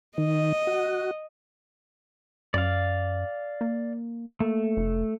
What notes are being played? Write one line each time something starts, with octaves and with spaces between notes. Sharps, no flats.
D#3 D#5
F#4
F#2 D5 F5
A#3
A3 A#3
F1